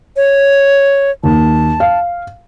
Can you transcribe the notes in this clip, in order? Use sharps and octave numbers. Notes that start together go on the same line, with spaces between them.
C#5
D#2 A5
F5